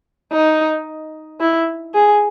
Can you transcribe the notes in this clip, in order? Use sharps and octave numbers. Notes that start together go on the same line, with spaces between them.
D#4
E4
G#4